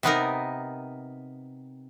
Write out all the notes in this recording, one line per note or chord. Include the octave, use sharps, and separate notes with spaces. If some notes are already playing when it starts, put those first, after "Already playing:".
C3 B3 D#4 A#4